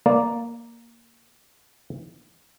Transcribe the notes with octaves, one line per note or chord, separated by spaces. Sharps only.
A#3 D5